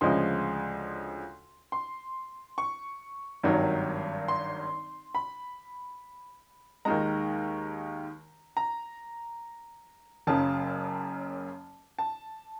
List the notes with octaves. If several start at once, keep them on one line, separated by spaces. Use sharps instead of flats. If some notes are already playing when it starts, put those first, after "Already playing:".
D2 C#3 F3 G#3 C6
C6
C#6
G#1 G2 D#3 F#3
C6
B5
D#2 D#3 G#3 A#5
A#5
F#1 F#2 C#3 A5
A5